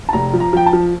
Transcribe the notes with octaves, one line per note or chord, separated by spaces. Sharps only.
A5
F1 A#5
F3
A#5
F3 G5
A5
F3